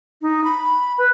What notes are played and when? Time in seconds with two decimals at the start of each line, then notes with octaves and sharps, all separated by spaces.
0.22 D#4
0.44 B5
0.98 B4